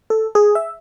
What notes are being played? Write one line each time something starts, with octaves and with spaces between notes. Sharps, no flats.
A4
G#4
E5